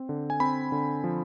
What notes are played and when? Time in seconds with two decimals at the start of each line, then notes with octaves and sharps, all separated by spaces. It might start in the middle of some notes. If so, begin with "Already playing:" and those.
Already playing: C4
0.09 D3
0.30 G#5
0.40 C4 B5
0.72 D3
1.04 F3